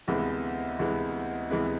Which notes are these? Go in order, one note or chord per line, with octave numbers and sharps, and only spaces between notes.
D2 C3 E3 G#3 B3
D2 C3 E3 G#3 B3
D2 C3 E3 G#3 B3